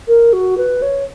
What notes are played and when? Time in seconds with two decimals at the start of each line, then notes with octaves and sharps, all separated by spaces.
0.08 A#4
0.33 F#4
0.58 B4
0.82 C#5